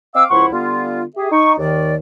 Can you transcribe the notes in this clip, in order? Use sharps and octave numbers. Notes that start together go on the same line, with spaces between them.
C4 D#5 F5 D6 E6
C#2 F3 E4 F#5 C6 C#6
D3 G3 B3 F4
G4 G#4 E5
D#4 C#6
D#2 D#3 D5